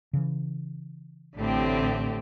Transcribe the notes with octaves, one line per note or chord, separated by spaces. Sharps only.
C#3 E3
A1 A2 D3 C4 G4